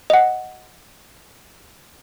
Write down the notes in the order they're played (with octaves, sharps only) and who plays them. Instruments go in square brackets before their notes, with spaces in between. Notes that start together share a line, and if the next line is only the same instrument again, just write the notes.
[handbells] D#5 F#5